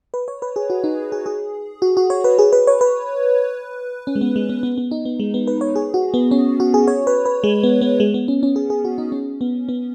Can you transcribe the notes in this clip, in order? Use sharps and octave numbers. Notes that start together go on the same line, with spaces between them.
B4
C#5
B4
G#4
F#4
D#4
G#4
G#4
F#4
F#4
C#5
B4
G#4
B4
C#5
B4
C#4
G#3
B3
G#3
B3
B3
B3
D#4
B3
G#3
B3
B4
C#5
G#4
F#4
B3
C#4
F#4
G#4
C#5
B4
B4
G#3
B3
B3
G#3
B3
C#4
C#4
G#4
G#4
F#4
D#4
C#4
B3
B3